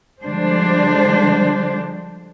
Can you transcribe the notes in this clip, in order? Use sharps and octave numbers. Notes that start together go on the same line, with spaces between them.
D3 F3 G3 G#3 D4 C5